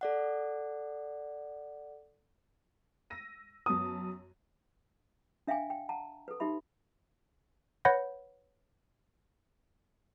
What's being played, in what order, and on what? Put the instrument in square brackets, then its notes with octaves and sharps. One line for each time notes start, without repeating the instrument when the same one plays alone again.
[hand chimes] A4 D5 F#5
[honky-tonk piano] E6 A#6 D#7
[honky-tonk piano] F#2 B3 A5 [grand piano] D#6
[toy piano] D4 E5 F5 G5 G#5
G5
F#5 A5 A#5
A4 B4
D#4 G4 E5 B5
[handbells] B4 C#5 F#5 B5 G6 A#6